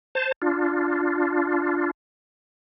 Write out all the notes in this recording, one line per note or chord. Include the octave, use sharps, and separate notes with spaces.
C5 A5
D4 F4